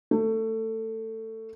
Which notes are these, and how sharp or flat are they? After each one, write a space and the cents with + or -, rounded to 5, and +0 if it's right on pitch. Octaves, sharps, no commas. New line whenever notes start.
A3 +20